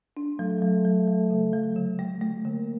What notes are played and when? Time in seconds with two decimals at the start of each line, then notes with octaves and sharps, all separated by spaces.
0.17 D4
0.39 F#3 A3
0.62 F#3
0.85 F#3
1.08 F#3
1.30 C#3
1.53 F#3
1.76 D3
1.99 A3
2.21 A3
2.45 D3 A#3